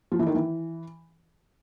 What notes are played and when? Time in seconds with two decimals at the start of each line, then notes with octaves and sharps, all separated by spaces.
0.12 F3
0.19 E3
0.27 D#3
0.35 E3